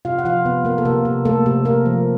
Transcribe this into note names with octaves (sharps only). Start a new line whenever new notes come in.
C3 F4 F5
F#5
F3 F4 F5
C3 B3 B4
A#3 A#4
A4
C3 A#3 A#4
C3
A3 A#3 A4
C3
C3 A#3 A#4
F3